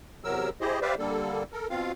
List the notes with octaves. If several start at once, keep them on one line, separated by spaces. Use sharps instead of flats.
E2 C3 F#3 A#4 E6
E4 G4 G#4 C5 D#5
G4 B4 C5 D5 E5 F5
D3 G3 A#3 A4
A4 A#4
B2 C4 F4 F5